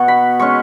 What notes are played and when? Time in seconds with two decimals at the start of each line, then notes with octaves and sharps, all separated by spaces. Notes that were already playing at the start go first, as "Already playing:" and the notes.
Already playing: B2 B3 C#6
0.08 B5
0.39 G#3 C#4 C#6